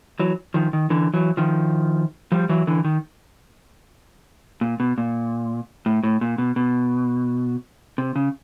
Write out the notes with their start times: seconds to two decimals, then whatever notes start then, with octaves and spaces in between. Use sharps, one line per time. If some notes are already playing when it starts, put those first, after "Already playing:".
0.19 E3 F#3
0.54 D#3 F3
0.73 D#3
0.90 D3 E3
1.14 E3 F#3
1.37 D#3 F3
2.32 F3 G3
2.49 E3 F#3
2.67 D3 E3
2.84 D#3
4.61 A#2
4.80 B2
4.98 A#2
5.86 A2
6.03 A2
6.21 A#2
6.38 B2
6.56 B2
7.98 C3
8.16 C#3